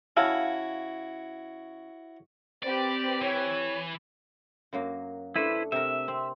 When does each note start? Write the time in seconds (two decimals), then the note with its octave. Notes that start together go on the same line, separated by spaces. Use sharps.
0.17 C#3 E4 F#4 A4 C#5 F5
2.63 C4 G4 B4 D5
3.22 E3 C#5
4.73 F#2 F#3 A#3
5.36 A3 D4 E4 B4 C5
5.72 C3 A#4 E5
6.08 C4